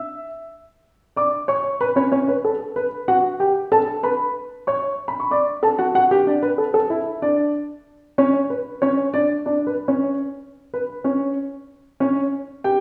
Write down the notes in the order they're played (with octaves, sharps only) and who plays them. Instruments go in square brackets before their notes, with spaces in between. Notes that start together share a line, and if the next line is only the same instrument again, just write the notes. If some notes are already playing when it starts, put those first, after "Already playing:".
Already playing: [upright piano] E5 E6
D5 D6
C#5 C#6
B4 B5
C#4 C#5
C#4 C#5
B4
A4
B4
F#4 F#5
G4 G5
A4 A5
B4 B5
C#5 C#6
B5
C#6
D5 D6
A4 A5
F#4 F#5
F#4 F#5
G4 G5
D4 D5
B4
A4
A4
E4 E5
D4 D5
C#4 C#5
B4
C#4 C#5
D4 D5
D4 D5
B4
C#4 C#5
B4
C#4 C#5
C#4 C#5
G4 G5